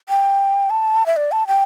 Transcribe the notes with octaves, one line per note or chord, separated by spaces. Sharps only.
G5
A5
E5
D5
A5
G5